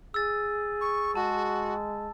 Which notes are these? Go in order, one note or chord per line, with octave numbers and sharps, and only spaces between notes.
G#4 E6 A6
C#6
G#3 F#4 A5